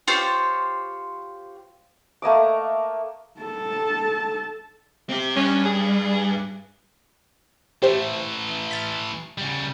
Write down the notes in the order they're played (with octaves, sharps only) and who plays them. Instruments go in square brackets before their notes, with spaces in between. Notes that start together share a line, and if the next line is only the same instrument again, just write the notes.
[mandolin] F4 G4 C5 C#5
[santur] A3 A#3 D#5 D6
[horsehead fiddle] A4 A5
[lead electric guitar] C4 G4
[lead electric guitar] G2 [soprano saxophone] C#4
[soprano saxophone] G#4
[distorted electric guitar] E3 A3 [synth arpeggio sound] G4 C5
[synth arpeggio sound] F6 A6 B6
[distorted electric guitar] C#3 G3